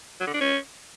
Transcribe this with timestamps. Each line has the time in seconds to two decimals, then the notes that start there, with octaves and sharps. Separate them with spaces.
0.20 F#3
0.27 D3
0.34 D4
0.41 C#4